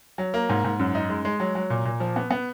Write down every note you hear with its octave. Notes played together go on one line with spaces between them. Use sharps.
F#3
A#3
G#2
G#2
F#2
D#4
G#3
G#3
F#3
F#3
A#2
A#2
F3
B3
B3